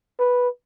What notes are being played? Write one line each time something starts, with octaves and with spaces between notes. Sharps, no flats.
B4